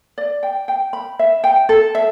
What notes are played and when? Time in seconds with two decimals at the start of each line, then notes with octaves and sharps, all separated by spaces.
0.18 D5
0.43 G5
0.68 G5
0.93 B5
1.19 E5
1.44 G5
1.69 A4
1.95 E5